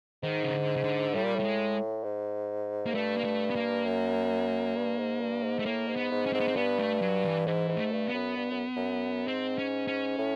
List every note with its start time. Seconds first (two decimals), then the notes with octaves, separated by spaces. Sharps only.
0.23 G#2 D#3
0.44 C#3
0.54 D3
0.76 C#3
0.84 D3
1.14 A2 G3
1.24 A#2
1.36 A2 G3
1.44 G#3
2.04 G#2
2.86 A#3
2.94 G2 A3
3.17 A#3
3.24 A3
3.50 B3
3.56 A#3
3.85 F#2
4.76 G2
4.98 G#2
5.20 G2
5.44 G#2
5.59 A3
5.66 A2 A#3
5.88 G#2
5.96 B3
6.11 G#2
6.26 C#4
6.33 G#2 C4
6.40 B3
6.48 C4
6.56 G2 B3
6.79 A3
7.02 F#3
7.24 E3
7.47 G#2 E3
7.69 G#2
7.77 A3
7.92 G2
8.07 B3
8.14 F#2
8.37 G2
8.51 F#2
8.76 F#2
9.27 G#2 C4
9.58 C#4
9.88 C#4
10.19 A2